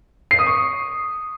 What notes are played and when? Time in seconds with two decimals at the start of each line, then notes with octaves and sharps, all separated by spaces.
0.31 C7
0.39 D#6
0.47 C#6